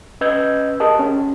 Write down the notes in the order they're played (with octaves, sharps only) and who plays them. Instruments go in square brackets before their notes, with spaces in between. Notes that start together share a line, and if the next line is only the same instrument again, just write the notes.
[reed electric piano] C#4 B4 D#5 E6 G6 G#6
G4 G#4 A#4 D#5 A5 D#6
C2 C#4 G4